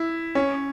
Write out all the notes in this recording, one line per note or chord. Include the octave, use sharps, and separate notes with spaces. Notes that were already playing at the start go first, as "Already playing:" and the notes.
Already playing: E4
C#4